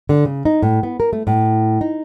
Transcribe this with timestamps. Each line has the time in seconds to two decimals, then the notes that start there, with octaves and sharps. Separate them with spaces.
0.09 D3
0.25 C#3
0.45 D#4
0.63 A2
0.83 B3
1.00 A#4
1.13 A3
1.27 A2
1.81 D#4